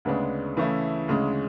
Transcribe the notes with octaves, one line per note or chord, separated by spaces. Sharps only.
D2 C#3 G#3 B3 D4
C#3 E3 A3 E4
D2 C#3 G#3